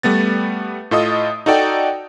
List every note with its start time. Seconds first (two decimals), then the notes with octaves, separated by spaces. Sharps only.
0.03 G3 A3 B3 A6
0.91 A2 F4 A4 D#5 D#6
1.46 D#4 F#4 A4 D5 G5